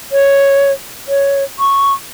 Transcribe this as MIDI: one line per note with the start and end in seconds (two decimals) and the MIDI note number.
0.12 0.72 73
1.08 1.43 73
1.59 1.93 85